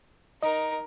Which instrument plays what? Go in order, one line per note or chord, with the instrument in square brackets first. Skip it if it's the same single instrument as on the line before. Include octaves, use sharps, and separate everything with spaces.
[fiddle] D#4 A#4 [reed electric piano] D#5